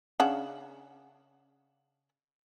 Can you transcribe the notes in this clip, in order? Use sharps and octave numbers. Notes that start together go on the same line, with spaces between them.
C#3 D4 F#5